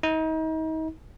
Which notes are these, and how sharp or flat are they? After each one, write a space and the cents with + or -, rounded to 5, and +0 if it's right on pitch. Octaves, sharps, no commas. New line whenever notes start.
D#4 +35